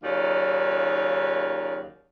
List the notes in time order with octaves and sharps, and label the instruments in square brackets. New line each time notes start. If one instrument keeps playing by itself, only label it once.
[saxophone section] D#2 C#3 F#3 D#4 F4 D5